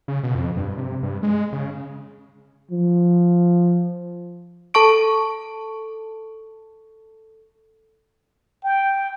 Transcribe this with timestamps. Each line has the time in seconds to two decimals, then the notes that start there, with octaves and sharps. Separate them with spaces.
0.08 C#3
0.23 B2
0.35 F2
0.57 G2
0.77 C3
1.03 G2
1.23 G#3
1.53 C#3
2.71 F3
4.74 A4 A5 C#6 D7
8.64 G5